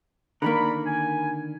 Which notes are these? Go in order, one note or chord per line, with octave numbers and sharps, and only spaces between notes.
D3 D#3 A#3 D5 A#5 B5
G#5